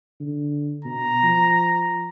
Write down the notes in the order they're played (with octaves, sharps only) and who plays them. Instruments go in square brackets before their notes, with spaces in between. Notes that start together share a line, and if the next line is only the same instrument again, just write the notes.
[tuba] D3
[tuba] B2 [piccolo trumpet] A#5
[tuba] F3